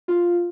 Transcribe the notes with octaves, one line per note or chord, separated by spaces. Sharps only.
F4